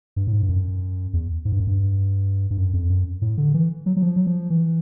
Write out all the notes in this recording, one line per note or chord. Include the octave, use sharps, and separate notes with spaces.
G2
A2
G#2
G2
F#2
E2
G#2
G2
F#2
G2
G2
F#2
F2
F#2
A2
D3
E3
F#3
F#3
F3
F#3
F3
E3